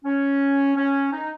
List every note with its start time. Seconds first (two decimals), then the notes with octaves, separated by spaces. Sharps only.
0.05 C#4
0.76 C#4
1.12 D#4